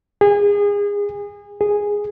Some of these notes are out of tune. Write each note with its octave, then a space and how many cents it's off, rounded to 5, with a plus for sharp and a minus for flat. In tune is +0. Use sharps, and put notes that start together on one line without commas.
G#4 -30
G#4 -10